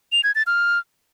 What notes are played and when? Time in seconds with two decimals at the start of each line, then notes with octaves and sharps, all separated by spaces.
0.12 F7
0.24 G#6
0.35 A6
0.47 F6